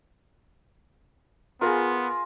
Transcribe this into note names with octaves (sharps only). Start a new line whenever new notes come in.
B3 F4 G#4 A#4